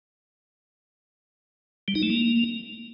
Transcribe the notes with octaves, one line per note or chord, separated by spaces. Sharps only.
G3
D#4
A3
A#3